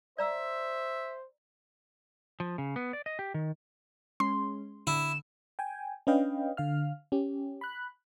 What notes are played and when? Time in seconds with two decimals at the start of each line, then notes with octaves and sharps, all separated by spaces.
0.18 C5 D5 E5 A#5 E6
2.40 F3
2.58 C#3
2.76 B3
2.93 D5
3.06 D#5
3.19 G4
3.34 D#3
4.20 G#3 C#4 C6
4.87 D3 E4 E7
5.59 G5 G#5
6.07 C#4 D4 B4 D#5 F5 G5
6.57 D3 F5 F6
7.12 C#4 G4
7.61 B5 F#6